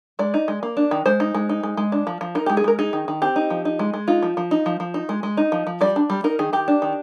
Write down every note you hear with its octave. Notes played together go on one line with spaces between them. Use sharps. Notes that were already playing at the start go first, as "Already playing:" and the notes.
G#3 D5
D#4
G#3
A#3
D4
D#3
G#3 C5
D#4
G#3
D#4
G#3
G#3
D4
F3
F3
D#4 A#4
G4
G#3
G#4
G#3 A#4
D#4 G#4
D#3
D#3
C4 G4
D#4
F3
D#4
G#3
G#3
D#4 F4
F3
F3
D#4
F3
F3
D#4
G#3
G#3
D#4
F3
F3
G3 D5
D4
G3
D#4 A#4
D#3 G#4
D#3 G4
D4
D#3